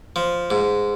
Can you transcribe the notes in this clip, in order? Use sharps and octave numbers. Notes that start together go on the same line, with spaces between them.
F3
G#2